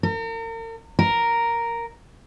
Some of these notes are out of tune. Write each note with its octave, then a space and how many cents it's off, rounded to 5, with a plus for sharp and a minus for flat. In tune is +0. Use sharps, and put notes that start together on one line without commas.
A#4 -40
A#4 +0